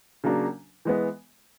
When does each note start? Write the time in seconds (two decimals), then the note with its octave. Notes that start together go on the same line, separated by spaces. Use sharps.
0.24 C#3 F#3 A#3 D4 F#4
0.85 E3 G#3 B3